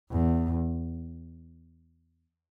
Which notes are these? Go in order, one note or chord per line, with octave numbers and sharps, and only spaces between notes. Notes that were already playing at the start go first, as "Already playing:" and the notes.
E2